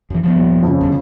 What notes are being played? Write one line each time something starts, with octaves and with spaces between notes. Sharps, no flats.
F#2 E3
F3 G3 B3
D#1
F2 C#3
E2 G2 D3